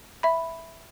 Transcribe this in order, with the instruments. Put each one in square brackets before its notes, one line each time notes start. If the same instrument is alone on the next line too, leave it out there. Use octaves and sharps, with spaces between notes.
[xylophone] E5 B5